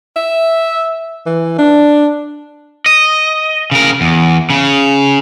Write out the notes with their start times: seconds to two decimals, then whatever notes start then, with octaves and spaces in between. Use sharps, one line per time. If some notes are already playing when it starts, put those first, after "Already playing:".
0.16 E5
1.26 E3
1.58 D4
2.86 D#5
3.71 C#3 A#4
4.01 E2
4.50 C#3